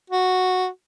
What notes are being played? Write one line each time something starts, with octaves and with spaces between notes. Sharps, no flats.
F#4